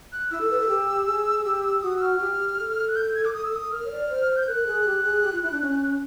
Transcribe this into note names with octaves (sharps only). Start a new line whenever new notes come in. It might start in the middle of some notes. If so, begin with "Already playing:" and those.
F#6
E4 E6
A4
B4
A4
G4
G#4
G4
F#4 D#6
E6
F6
G4
A4
F#6
G6
G#6
D6
D#6
E6
D#6
A#4 F6
C#5
D5
C5
G6
A#4 F#6
G#4
G4
G#4
G4
F4
E4
D4
C#4